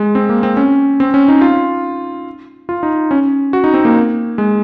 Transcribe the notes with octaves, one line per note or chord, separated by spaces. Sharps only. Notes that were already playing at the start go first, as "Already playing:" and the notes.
Already playing: G#3
C4
A#3
C4
C#4
C4
C#4
D#4
F4
F4
D#4
C#4
F#4
D#4
C4
A#3
G#3